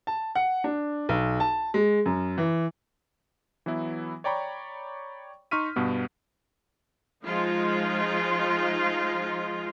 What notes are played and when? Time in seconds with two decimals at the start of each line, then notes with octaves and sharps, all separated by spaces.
0.07 A5
0.35 F#5
0.64 D4
1.09 B1
1.40 A5
1.74 G#3
2.06 F#2
2.38 E3
3.66 E3 F#3 B3 E4
4.24 C#5 D5 G5 A#5 B5 C#6
5.51 D#4 C6 C#6 F6 B6 D#7
5.76 G2 B2 B3
7.24 F3 G#3 D#4 F4